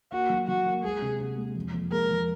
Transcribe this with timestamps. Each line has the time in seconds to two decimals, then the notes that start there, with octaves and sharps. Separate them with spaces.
0.12 A#3 F#4
0.30 F#3
0.48 F#3 F#4
0.66 A#3
0.83 G#3 G#4
1.02 C3
1.20 C3
1.38 G#3
1.56 F2
1.74 F2
1.92 G#3 A#4
2.10 F2